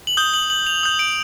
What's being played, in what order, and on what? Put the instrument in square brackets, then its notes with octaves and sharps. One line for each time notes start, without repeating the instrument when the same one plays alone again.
[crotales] F#7
D#6 G6 G7
F#7
F#7
F7
D#6 G6
D7